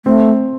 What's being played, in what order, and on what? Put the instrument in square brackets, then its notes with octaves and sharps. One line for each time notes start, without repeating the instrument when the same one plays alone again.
[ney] A3 [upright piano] C4